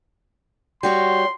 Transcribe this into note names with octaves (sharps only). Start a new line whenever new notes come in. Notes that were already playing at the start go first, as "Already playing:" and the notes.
G3 F#4 C#5 C6